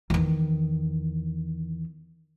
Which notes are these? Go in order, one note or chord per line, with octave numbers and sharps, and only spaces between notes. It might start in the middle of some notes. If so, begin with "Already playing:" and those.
E2 D#3